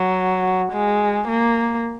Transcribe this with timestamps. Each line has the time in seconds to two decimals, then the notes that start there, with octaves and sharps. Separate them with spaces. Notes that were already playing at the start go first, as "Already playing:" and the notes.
Already playing: F#3
0.72 G#3
1.28 A#3